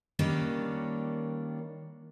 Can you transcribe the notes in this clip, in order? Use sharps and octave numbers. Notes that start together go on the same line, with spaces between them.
D#3 G3 A#3 C#4 D4